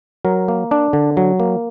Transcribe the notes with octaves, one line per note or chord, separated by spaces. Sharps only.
F#3 A#4
A#3
D4
D3
F#3
A#3